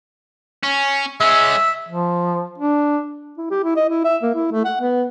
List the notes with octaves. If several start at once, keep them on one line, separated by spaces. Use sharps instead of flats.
C#4
G#3 C#4 E5
F3
D4
E4
G4
E4
D#5
E4
E5
A#3
E4
A3
F#5
B3